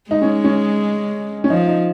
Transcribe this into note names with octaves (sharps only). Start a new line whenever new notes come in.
G#3 D#4
C#4
C#4
C#4
F3 D#4
D#4